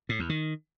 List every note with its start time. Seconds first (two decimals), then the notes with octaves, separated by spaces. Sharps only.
0.09 A2
0.19 E2
0.29 D#3